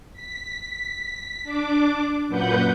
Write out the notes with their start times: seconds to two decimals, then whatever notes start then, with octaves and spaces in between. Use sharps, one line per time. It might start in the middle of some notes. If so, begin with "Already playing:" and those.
0.13 B6
1.44 D4 D6
2.27 F#2 A#2 B4 F#5 G6